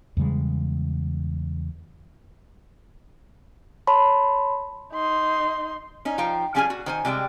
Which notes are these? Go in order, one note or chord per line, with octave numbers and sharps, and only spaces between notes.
E2 C#3 G3 G#3
C#5 A5 B5 C6
D#4 C6
C#4 D#4
F3 D#4 F5 G5
F3 G3 C#4 G#4 A#4 G#5
F#4
D#3 C5 G#5
C3 G3 G#3 G5